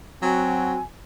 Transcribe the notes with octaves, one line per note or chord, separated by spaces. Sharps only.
F#3 C4 F#4 G#5